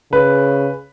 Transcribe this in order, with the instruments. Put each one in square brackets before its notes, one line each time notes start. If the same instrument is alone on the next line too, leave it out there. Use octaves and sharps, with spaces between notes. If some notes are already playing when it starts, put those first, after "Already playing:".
[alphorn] C#3 [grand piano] B4